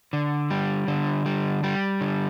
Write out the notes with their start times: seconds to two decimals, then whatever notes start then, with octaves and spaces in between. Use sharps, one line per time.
0.13 D3
0.50 G3
0.88 D3
1.26 G3
1.64 G3
2.01 D3